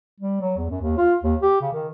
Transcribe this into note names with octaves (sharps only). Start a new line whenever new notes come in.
G3
F#3
E2
F#2
D#2
F4
D#2
G4
C#3
D#3